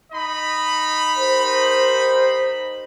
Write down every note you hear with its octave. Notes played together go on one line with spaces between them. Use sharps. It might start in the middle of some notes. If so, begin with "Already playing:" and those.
D#4 D#5 B5
G4 A#4 C5